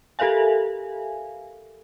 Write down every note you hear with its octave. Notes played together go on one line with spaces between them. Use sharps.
G4 A4 A#4 E5 F5 G#5